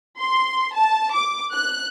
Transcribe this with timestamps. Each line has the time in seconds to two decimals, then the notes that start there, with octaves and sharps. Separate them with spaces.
0.19 C6
0.74 A5
1.14 D6
1.53 F#6